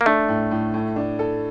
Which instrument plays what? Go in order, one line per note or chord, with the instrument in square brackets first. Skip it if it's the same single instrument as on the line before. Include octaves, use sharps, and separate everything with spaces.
[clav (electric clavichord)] A#3
[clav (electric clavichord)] A3 [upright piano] D4
[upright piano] A2
A2
A2
D4
A4